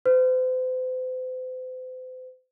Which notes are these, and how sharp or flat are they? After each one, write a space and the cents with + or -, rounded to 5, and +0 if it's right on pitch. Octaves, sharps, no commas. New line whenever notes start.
C5 -40